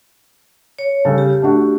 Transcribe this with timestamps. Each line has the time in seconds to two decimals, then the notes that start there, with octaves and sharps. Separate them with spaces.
0.79 C#5
1.05 C#3 G3 A4
1.18 G4
1.42 A3 D4 F#4